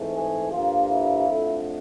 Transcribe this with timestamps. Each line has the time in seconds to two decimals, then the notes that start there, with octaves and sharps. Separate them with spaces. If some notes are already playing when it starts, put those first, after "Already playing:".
Already playing: G#2 E3 A3 C4
0.16 G#4
0.52 G2 D3 F3 A#3 F4
0.90 E4
1.27 F2 D3 F3 A3